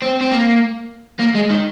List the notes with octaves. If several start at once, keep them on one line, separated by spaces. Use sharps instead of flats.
C4
C4
A#3
A#3
G#3
D#3